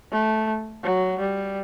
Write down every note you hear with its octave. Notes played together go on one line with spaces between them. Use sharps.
A3
F#3
G3